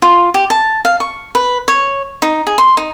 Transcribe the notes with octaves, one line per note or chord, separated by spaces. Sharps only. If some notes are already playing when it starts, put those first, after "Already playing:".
F4
G4
A5
F5
C#6
B4
C#5
D#4
G#4
C6
D#4